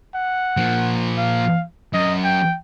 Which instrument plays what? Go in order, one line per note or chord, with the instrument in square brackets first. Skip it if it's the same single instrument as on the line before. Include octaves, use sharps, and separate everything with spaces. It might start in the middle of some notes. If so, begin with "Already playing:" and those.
[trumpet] F#5
[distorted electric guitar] A#2 F3
[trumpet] F5
[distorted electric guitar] F#2 [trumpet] D#5
[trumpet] G5